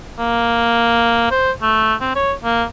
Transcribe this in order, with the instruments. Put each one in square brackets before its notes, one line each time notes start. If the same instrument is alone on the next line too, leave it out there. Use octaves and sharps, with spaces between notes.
[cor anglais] A#3
C5
A3
C4
C#5
A#3